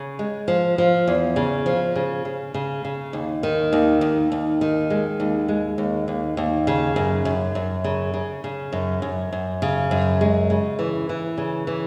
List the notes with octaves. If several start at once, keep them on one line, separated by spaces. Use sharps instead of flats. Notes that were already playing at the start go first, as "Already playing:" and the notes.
Already playing: C#3
G#3
F3
F3
E2
C#3
F3
C#3
C#3
C#3
C#3
D#2
D#3
D#2
D#2
D#2
D#3
G#3
D#2
G#3
D#2
D#2
D#2
C#3
F#2
F#2
F#2
C#3
C#3
C#3
F#2
F#2
F#2
C#3
F#2
G#3
C#3
E3
E3
C#3
E3